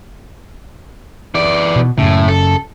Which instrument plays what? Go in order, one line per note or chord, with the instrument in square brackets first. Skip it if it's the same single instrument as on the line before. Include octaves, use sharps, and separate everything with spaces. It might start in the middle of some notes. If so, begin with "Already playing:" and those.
[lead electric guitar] E3 D5
[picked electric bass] B2
[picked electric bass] F#2 C#3 [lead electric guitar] A2
[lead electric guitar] A4